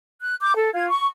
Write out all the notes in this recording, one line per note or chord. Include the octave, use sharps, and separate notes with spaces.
F#6
D6 G6
A4
F4 G#6
C#6